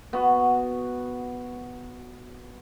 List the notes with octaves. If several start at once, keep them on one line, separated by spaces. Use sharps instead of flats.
B3 F#4